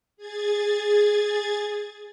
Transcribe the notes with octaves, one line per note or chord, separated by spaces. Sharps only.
G#4 G#6 A6